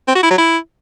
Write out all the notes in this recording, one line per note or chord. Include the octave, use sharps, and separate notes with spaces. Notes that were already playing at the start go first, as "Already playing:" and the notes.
C4
F#4
E4
F#3
E4